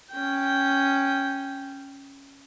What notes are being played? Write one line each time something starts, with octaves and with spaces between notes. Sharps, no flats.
C#4 G5